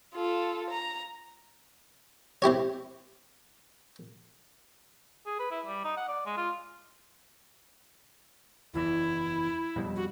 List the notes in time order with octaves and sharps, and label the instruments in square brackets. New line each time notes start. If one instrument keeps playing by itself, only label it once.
[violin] F4 A4
A#5
[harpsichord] C4 E4 G4 C#5
[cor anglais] G#4
B4
E4
G3
D#4
F#5
D5
G#3
F4
[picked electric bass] F#1 E2 E3 [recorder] E4
[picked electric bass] F2 B2 G3
[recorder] F#4